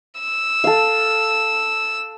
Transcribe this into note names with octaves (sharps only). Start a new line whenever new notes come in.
E6
A4 F5